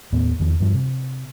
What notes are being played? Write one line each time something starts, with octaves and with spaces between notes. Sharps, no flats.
D#2 A2 B3
E2 D#3 F3
G2 F3
C3